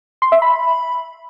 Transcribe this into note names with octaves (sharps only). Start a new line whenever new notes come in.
C6
E5
B5